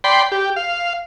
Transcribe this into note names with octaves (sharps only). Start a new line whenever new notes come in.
D5 G5 B5 C6
G4
F5